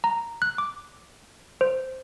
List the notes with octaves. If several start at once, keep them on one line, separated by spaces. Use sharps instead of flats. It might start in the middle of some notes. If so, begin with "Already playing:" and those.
A#5
F#6
D6
C5